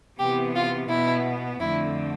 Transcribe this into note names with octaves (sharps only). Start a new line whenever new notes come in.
C3 E3 B3 G4
F4
B2 B3 E4
F2 D3 A3 C4 E4